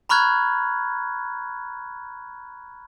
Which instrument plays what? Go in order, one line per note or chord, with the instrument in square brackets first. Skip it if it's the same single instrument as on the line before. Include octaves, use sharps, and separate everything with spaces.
[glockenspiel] A#5 B5 C#6 F6 F#6 G#6